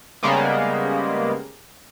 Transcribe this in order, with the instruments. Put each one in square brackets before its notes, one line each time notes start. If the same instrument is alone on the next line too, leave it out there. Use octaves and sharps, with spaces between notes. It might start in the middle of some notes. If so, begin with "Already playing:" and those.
[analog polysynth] C#3 G3 G#3 A#3 B3